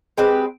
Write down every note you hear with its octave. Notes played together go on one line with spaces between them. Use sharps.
G#3 C4 G4 B4